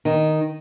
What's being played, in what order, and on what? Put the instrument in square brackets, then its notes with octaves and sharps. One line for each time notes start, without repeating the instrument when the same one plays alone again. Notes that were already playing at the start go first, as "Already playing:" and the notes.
[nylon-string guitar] D#3